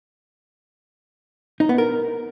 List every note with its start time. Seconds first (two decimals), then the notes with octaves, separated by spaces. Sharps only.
1.60 D#4
1.69 B3
1.78 A#4